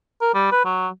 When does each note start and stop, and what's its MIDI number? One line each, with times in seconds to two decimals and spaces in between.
0.22 0.33 70
0.34 0.50 55
0.52 0.64 71
0.65 0.88 54